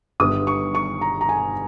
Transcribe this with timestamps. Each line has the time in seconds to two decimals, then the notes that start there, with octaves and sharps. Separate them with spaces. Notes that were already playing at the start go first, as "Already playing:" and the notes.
0.20 G1 G2 G3 B3 D#6
0.47 C#6
0.75 C#6
1.01 A#5
1.21 A#5
1.29 G#5